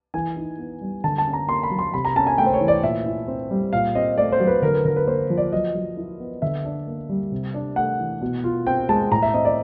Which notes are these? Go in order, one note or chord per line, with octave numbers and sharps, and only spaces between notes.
E3 G#5
D#4
B3
G3
D3 A5
A5
C#4
A#5
A#3 C6
B5
F#3
C6
C3 B5
A#5
C#4 A5
G#5
A3 G5
C5
C#5
E3
D5
A#2 E5
E4
C4
G3
A#2 F5
C4 D#5
A3 D5
C5
F#3
B4
D3 A#4
B4
D3 A#4
B4
A#3 C5
F3
D5
F#3 D#5
F#3
E4
B3
D3 E5
D4
A#3
G3
C3
D4
A3 F#5
E3
B2
F4
C4 G5
G#3 A5
A2 A#5
E5
C4 D#5
D5